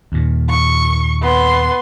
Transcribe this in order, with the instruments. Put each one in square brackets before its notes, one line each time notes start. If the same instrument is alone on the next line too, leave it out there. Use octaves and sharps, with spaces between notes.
[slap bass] D#2 A#2
[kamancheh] C#6
B3 C6